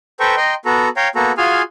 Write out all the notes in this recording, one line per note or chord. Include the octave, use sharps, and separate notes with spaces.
A4 B4 C5 G5 A#5 C#6
D#5 G5 A#5 C6
B3 F#4 A4 A#5
C#5 F5 G5 A#5
A#3 B3 F#4 A4 A#5
F4 F#4 G#4 F5 G#5 F6